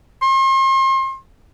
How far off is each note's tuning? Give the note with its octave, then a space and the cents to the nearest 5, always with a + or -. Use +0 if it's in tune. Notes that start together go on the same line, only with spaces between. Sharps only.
C6 +40